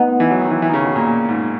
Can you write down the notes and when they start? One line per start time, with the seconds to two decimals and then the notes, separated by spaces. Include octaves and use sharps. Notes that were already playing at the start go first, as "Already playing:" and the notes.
Already playing: B3 D#4
0.20 E3
0.31 F#3
0.41 D#3
0.51 E3
0.62 E3
0.69 D#3
0.74 C#3
0.85 B2
0.96 A#2
1.06 A#2
1.29 G#2